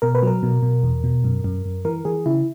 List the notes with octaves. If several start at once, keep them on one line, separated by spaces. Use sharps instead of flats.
B2 A#4
B4
F#3 A#4
B2
B2
E2
B2
F#2
F#2
F#2
E3 A#4
E3 G#4
C#3 E4